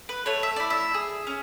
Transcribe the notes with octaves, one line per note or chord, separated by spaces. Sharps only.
B4
A3 C#5
E5
E4 D5
E5
G#4
C#4